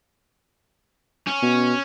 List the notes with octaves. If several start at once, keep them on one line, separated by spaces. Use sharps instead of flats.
C#4
B2